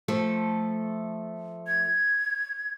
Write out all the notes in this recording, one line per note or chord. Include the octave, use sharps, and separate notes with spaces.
F3 A3 A4
G#6